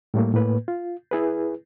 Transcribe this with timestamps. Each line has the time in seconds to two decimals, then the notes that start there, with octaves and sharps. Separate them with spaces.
0.14 A2 G3 A3 A#3
0.34 A2 A#3 B4
0.68 F4
1.11 E4 G#4 B4